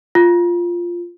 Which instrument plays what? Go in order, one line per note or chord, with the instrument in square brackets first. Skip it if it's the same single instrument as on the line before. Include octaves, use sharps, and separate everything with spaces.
[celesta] F4